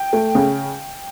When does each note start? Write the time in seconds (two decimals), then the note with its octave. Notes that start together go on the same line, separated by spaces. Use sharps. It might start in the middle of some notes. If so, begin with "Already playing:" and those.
Already playing: G5
0.13 A3
0.35 C#3